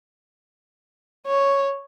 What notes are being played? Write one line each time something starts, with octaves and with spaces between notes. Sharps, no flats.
C#5